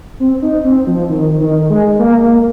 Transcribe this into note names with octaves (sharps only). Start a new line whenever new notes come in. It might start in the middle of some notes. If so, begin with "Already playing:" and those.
C4
D#4
C4
F3
D#3
D#3
G#3
A#3
A#3